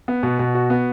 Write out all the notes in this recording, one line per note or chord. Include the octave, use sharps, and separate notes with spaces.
B3
B2
B2
F#4
B3